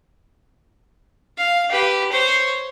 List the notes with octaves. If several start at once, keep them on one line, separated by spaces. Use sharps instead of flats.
F5
G4 B4
C5 C#5